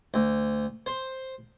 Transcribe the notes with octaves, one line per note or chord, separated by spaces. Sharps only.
D2
C5